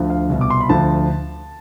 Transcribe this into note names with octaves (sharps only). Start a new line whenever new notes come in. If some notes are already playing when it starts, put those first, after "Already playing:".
Already playing: D2 D3 F3
F5
C2 B2
D6
C6
B5
D2 D3 F3 A5